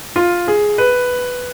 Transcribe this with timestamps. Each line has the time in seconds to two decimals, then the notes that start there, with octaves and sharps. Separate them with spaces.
0.16 F4
0.48 G#4
0.78 B4